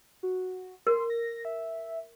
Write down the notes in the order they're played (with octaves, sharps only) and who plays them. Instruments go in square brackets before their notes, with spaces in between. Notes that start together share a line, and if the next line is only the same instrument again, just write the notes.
[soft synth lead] F#4
[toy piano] A#4 [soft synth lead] C6
[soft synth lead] A#6
E5